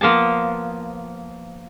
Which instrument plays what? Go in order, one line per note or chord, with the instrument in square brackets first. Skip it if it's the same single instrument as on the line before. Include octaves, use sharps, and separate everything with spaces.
[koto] F3 A#3 B3 A5